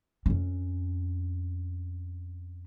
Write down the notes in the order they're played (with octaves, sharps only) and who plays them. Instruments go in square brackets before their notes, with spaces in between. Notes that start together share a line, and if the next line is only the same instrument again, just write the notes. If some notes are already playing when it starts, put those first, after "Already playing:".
[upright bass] F2 C#4